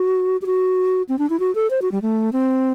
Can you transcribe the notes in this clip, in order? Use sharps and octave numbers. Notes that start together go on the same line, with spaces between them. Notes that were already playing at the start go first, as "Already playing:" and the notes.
Already playing: F#4
G4
F#4
C4
D4
E4
F#4
A4
C5
F#4
G3
A3
C4